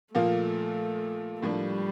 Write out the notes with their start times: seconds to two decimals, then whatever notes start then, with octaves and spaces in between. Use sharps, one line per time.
0.15 A#2 F3 A3 A#3 F4
1.42 A2 F3 G3 A#3 D4